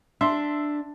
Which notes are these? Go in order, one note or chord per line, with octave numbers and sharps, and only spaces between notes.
D4 E5 C6